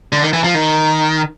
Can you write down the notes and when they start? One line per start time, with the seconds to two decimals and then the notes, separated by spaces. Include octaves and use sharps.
0.12 D3
0.22 D#3
0.33 E3
0.44 F3
0.55 D#3